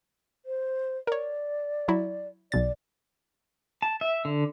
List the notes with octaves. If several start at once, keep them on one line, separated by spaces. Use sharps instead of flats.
C5
A#4 C#5 D5
F#3 E4 F#4
B1 B2 D5 A6
A5
E5
D3